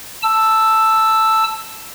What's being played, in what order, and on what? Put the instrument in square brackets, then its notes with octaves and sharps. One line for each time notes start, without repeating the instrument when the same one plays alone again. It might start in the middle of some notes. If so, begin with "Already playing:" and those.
[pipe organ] A5 E6